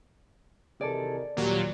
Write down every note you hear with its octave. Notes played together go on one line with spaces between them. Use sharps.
C3 D#3 E3 G#4 A4 D5
D#2 A#2 F#3 G3